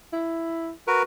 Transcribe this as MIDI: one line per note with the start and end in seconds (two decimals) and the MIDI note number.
0.13 0.71 64
0.87 1.03 66
0.87 1.03 70
0.87 1.03 71